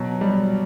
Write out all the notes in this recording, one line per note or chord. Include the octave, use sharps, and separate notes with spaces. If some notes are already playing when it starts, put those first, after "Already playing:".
Already playing: B2 F#3
G3